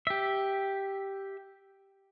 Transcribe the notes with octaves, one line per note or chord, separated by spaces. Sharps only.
G4 E5